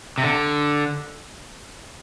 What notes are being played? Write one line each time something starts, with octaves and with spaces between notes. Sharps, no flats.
C3
D3